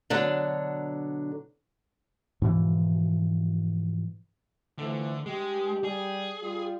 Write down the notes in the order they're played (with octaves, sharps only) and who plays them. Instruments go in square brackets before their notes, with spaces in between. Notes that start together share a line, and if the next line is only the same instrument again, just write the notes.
[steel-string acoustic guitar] B2 D3 F#3 D4
[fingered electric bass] G#2 B2 E3 F3
[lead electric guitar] D3 [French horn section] E3 F3 A3
[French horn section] G2 G4 [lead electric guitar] G#3
[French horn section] G3 [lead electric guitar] G#4
[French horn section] G3 F4